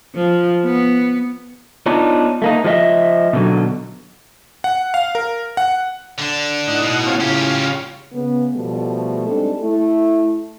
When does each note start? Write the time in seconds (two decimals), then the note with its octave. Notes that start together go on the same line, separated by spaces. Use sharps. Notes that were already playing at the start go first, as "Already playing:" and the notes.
0.15 F3
0.66 B3
1.86 B3 D4 D#4 F4 C#5
2.42 A3 A#3 D#4
2.64 F3 G#3 A3 D#5 E5
3.33 B2 D3 F#3
4.64 F#5
4.94 F5
5.15 A#4
5.57 F#5
6.19 D3 D4
6.68 A2 D#4 F#5
6.82 B2
7.06 C4 C#4 F4
7.21 C#3 C#4 F4 G4
8.12 C#3 B3
8.54 B2 F3 G3 A3
9.26 G3 G#3 C4 D4 D#4 A4
9.60 A3 E4